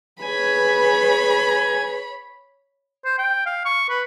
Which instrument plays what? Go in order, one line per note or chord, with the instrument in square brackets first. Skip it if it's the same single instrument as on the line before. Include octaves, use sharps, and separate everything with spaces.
[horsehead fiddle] G#4 B4 [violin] C#5 B5 [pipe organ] G#5 G#6
[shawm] C5
G5
F5
C#6
B4